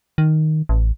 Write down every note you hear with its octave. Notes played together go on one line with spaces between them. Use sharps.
D#3
A1